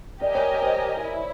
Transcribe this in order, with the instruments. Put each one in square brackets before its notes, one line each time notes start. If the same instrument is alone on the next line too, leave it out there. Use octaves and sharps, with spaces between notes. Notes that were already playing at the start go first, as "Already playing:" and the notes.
[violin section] G4 A#4 D#5 G#5 [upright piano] D5
[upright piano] C#5
C5
[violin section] E4